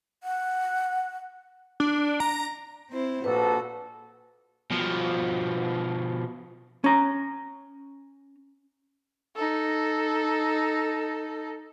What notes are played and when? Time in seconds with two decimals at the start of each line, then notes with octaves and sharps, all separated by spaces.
0.23 F#5
1.80 D4
2.20 A#5
2.91 C4 E4 C5
3.24 A#1 A#2 F#4 A4 B4
4.70 B2 F3
6.84 C#4 A#5
9.36 D#4 A4